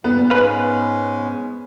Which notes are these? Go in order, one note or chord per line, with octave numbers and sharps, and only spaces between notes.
A#2 G3 B3
G#2 G#3 C#4 B4 F5